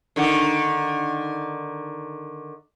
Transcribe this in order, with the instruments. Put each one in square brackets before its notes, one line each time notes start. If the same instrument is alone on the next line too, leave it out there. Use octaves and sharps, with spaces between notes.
[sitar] D3 D#3